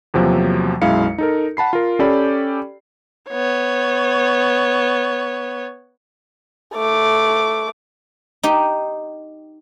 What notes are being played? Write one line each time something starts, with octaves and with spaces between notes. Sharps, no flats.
E2 C3 F3 F#3 A#3
B1 F#2 G#3 E4 F5 C#7
D#4 A4 A#4
F#5 A5 B5 C7
F4 A#4
C#4 G4 A4 D5 G5 B5
B3 C#5
A3 D6
D#4 G4